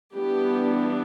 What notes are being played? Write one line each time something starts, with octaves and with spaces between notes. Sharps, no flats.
E3 G3 B3 D4 G4